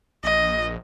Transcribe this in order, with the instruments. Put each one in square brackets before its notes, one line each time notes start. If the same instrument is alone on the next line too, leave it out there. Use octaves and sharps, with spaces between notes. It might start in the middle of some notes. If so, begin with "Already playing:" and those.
[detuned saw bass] A#1 [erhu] D#5